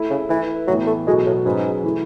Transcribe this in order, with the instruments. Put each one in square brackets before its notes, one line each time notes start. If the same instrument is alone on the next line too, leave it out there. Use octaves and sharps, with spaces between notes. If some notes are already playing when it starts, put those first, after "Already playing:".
Already playing: [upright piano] A3 E4 A4
[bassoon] C#3
[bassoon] E3 [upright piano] A3 E4 B4
[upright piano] A2 E3 B3 [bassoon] F#3
[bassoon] A3
[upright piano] B2 F#3 B3 F#4 A4 [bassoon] G#3
[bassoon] A2
[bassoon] G#2 [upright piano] F#3 C#4 G#4 B4
[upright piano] E3 A3 E4